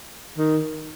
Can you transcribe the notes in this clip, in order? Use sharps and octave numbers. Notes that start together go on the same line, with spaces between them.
D#3